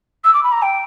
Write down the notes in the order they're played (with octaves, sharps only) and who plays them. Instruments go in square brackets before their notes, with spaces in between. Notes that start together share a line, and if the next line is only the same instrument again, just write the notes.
[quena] E6
D6
B5
A#5
G5